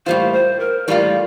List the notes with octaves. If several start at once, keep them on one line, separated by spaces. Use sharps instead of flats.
A2 G3 A#3 F4 C5
C5
A#4
A2 G3 A#3 F4 D5